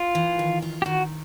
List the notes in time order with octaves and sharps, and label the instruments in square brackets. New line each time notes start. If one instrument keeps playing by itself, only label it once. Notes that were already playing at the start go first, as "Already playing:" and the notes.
Already playing: [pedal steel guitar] F4
[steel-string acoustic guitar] E3
D#3
F4
[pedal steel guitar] G4
[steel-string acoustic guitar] D#3 [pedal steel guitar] F#4